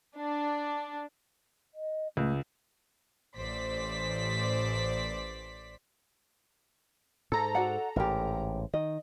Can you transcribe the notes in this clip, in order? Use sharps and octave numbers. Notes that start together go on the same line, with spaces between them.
D4
D#5
C#2 A3
A1 C5 D5 B6
G#2 A4 A#5
F#4 D5 F#5
A1 G#2 G4 A#4
D#3 D#5